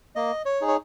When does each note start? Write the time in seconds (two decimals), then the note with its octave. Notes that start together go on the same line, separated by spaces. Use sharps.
0.15 A#3 D#5
0.45 C#5
0.61 D#4 G#4
0.68 C#5